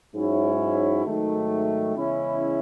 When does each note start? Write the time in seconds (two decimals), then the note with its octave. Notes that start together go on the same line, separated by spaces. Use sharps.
0.13 G#2 F#3 C#4 E4
1.05 G#2 D#3 F#3 A3
1.95 E2 C#3 G#3 C#4 E4